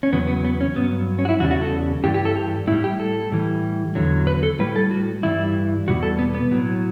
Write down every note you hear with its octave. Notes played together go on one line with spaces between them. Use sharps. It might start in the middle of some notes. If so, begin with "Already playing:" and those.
C#4
E2 C#3 F#3 B3
B3
B3
C#4
G2 F#3 B3
C#4
F#4
E4
E2 C#3 G3 F#4
F#4
A4
G2 E3 G3 G4
G4
A4
G4
A2 G3 E4
G4
A4
A2 E3 G3
E2 D3 F#3
B4
A4
A2 G3 B4
A4
F#4
G2 E3 G3 E4
E2 B2 G3 F#4
A4
B3
B3
A2 F#3